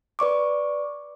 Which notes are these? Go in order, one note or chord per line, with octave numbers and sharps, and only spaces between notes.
B4 D5 C#6 D6